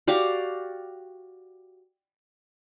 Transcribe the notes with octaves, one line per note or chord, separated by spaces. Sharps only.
F#4 G4 D5 F5